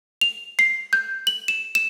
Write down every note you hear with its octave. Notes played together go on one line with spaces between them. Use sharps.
F7
C7
G6
F#7
E7
E7